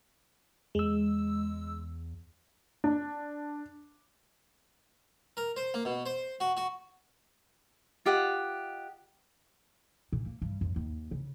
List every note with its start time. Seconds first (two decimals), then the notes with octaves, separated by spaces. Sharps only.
0.75 E2 G#3 E6
2.84 D4
5.37 A#4
5.56 C5
5.74 A#3
5.85 B2
6.06 C5
6.40 F#4
6.57 F#4
8.05 F4 G4 D#5 F#5
10.12 A#2
10.26 A#3
10.42 G2
10.61 F2
10.76 D#2
11.11 C#3